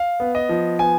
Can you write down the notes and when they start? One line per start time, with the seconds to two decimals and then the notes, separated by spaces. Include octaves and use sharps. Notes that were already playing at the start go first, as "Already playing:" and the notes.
Already playing: F5
0.20 B3
0.35 D#5
0.49 F3
0.79 B3 G#5